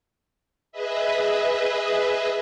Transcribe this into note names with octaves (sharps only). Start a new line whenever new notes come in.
G#4 B4 D#5 E5